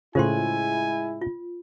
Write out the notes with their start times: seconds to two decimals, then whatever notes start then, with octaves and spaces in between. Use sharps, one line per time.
0.15 A2 C#3 G#3 E4 F4 C5 G#5 C6
1.21 F4